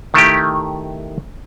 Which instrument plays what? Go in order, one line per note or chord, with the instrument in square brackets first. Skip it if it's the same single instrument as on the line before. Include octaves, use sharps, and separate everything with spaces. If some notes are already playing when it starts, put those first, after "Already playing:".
[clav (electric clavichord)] D#3 A3 E4 G4